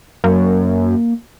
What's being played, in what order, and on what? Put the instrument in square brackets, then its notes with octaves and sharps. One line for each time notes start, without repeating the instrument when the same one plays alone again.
[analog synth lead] F#2 [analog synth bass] A#3